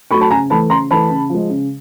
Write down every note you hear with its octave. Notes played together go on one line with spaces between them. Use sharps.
F#3 A3 B5 C#6
A5 B5
C#3 G#5 A#5
E3 A3 A5 B5
C#3 A#5 C6
E3 A3 A5 B5
C#3
F3 G#3
C#3